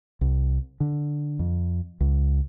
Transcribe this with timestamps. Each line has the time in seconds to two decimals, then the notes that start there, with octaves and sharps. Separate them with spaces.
0.21 C2
0.80 D3
1.39 F2
2.01 C#2